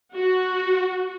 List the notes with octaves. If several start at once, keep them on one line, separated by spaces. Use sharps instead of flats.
F#4